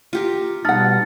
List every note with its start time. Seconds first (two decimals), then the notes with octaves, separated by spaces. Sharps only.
0.13 F4 G4 A#4 C#7
0.65 B2 G3 D#4 F#5 A5 F6 A6